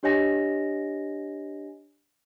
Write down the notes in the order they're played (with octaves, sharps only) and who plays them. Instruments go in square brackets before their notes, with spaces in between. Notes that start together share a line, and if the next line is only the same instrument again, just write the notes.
[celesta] D4 G4 C#5 D#5 G#5 A#6